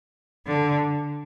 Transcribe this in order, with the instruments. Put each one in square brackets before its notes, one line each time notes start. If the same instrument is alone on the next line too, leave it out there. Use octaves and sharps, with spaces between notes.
[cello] D3